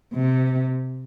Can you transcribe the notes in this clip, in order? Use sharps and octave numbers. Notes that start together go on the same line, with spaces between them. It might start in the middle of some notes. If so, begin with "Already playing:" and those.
C3